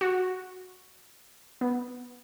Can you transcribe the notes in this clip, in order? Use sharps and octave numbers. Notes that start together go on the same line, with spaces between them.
F#4
B3